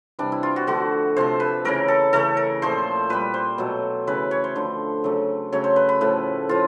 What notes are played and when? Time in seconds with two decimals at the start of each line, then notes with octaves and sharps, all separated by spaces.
0.19 C3 E3 G3 D4
0.32 E4
0.43 F4
0.56 F#4
0.67 D3 F3 A3 F#4
1.16 C3 F3 A3 C5
1.40 B4
1.65 C#3 E3 A3 A#4
1.88 A4
2.13 C#3 E3 A3 A4
2.37 A#4
2.62 A#2 F3 A3 C5
3.10 A#2 G3 B4
3.34 C5
3.58 B2 F#3 A3
4.07 C#3 E3 A3 B4
4.31 C#5
4.44 C5
4.55 D3 F3 A3
5.04 C#3 F#3 A3
5.52 C#3 F#3 A3 C#5
5.64 C5
5.76 B4
5.89 B4
6.01 A2 F3 A3 B4
6.49 A2 F3 F4